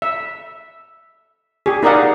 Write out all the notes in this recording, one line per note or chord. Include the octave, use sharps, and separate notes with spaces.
E5
G4 G#4
D#4 A#4 D5 D#5 F5 F#5